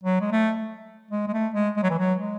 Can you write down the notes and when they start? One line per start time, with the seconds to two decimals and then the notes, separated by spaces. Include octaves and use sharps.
0.03 F#3
0.21 G#3
0.32 A3
1.11 G#3
1.28 G#3
1.33 A3
1.54 G#3
1.77 G#3
1.83 F#3
1.91 E3
1.98 F#3
2.19 G#3